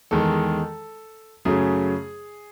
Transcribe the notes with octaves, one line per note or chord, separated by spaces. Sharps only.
E2 D#3 G#3 A4
F#2 C#3 F#3 A3 G#4